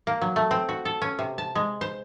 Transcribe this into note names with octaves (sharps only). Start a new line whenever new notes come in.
A#3
F#3
A3
C4
F#4
A4
C#4
C3
A5
G#3
C5